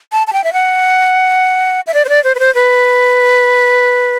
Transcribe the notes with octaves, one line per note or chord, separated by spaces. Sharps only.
A5
A5
G5
E5
F#5
E5
D5
C5
D5
C5
B4
C5
B4